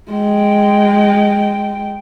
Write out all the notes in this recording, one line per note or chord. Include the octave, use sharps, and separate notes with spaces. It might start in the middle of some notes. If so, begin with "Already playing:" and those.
G#3 G5